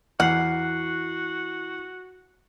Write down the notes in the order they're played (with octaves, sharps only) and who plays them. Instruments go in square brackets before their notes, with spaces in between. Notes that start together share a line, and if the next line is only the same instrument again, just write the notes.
[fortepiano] E2 F6 [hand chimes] E4 F#6 C7 [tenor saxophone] F#4 [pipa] F#5